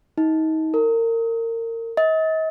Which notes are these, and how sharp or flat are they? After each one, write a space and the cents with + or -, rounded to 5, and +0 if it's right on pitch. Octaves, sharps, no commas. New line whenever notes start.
D#4 +30
A#4 -30
D#5 +40